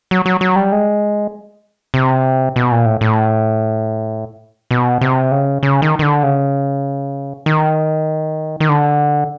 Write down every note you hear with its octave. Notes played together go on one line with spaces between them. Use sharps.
F#3
F#3
F#3
G3
G#3
C3
B2
A#2
A2
A2
B2
C3
C#3
C#3
D#3
D#3
D3
C#3
D#3
D#3
D3